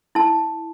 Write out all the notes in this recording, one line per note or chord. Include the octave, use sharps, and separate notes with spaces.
E4 A5